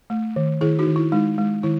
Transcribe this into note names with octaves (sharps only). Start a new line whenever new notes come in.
A3
D#3
D#3 E4 G#4
D#4 F#4
D#3
E4
G#3 D#4
G#3
D#3 E4